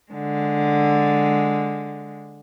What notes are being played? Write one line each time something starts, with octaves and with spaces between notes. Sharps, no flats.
D3 G#3